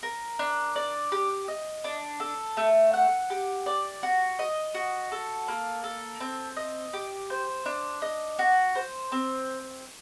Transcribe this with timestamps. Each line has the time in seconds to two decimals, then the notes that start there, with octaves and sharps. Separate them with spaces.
0.03 A#4
0.39 D4
0.76 D5
1.12 G4
1.48 D#5
1.84 D4
2.20 A4
2.57 A3
2.93 F#5
3.30 G4
3.66 D5
4.03 F#4
4.39 D#5
4.74 F#4
5.12 A4
5.48 A#3
5.84 A4
6.20 C4
6.57 D#5
6.93 G4
7.30 C5
7.66 D4
8.02 D#5
8.39 F#4
8.75 C5
9.12 C4